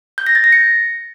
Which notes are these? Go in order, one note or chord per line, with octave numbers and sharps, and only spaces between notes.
G6
A#6
A6
A#6
C#7